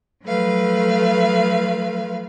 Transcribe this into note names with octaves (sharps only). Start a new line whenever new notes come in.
F3 F#3 A3 B4 F5